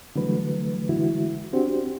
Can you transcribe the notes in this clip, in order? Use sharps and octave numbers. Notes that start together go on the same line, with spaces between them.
D3 E3 F#3 G3 A3 B4
D3 E3 G#3 E4 F#4
C4 D4 F#4 G4 C5